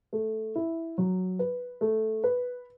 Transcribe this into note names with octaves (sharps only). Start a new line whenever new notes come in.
A3
E4
F#3
B4
A3
B4